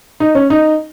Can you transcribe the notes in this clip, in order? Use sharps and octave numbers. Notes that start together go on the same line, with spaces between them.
D#4
C#4
D#4